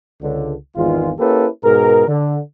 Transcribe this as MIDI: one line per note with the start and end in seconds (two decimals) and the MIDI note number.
0.21 0.54 37
0.21 0.54 50
0.76 1.12 32
0.76 1.12 40
0.76 1.12 51
0.76 1.12 56
0.76 1.12 65
1.19 1.47 58
1.19 1.47 61
1.19 1.47 64
1.19 1.47 67
1.19 1.47 69
1.19 1.47 71
1.63 2.04 44
1.63 2.04 47
1.63 2.04 68
1.63 2.04 70
2.07 2.39 50